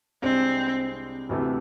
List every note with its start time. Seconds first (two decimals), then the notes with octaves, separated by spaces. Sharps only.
0.23 C2 C3 G#3 C4 D4
1.29 D2 C3 E3 A3